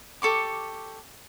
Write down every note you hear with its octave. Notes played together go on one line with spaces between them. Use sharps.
G4 A4 C#6 D6